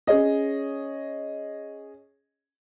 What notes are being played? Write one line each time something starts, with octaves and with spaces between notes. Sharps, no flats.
C#4 G#4 C#5 D#5